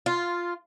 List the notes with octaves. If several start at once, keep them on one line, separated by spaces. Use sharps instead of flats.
F4